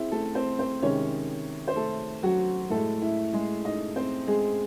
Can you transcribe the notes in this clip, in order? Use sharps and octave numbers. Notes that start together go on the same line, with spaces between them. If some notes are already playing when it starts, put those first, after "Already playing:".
Already playing: C4 E4 G#4
A3 A4
C4 C5
C4 C5
C3 D#3 G#3 C#4 C#5
C5
A3 A4
F#3 F#4
A2 G#3 A3 A4
E4
G#3 G#4
D#4 D#5
C4 C5
G#3 G#4